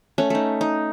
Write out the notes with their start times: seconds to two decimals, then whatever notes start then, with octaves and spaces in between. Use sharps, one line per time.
0.18 A3 C#4
0.30 A3 D#4
0.61 D#4